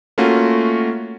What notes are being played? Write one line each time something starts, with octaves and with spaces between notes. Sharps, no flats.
A3 A#3 C#4 F4 F#4